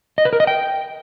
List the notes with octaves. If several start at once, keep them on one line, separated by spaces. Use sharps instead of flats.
D#5
B4
A#4
D#5
G5